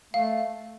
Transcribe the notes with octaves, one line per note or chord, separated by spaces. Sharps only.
A3 F5